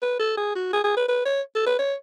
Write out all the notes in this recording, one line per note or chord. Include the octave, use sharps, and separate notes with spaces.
B4
A4
G#4
F#4
G#4
G#4
B4
B4
C#5
A4
B4
C#5